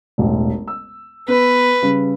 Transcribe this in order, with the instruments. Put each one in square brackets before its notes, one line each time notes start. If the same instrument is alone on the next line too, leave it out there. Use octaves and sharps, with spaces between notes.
[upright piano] E1 A1
E6
[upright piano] B3 [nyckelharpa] B4
[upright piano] C#3 G3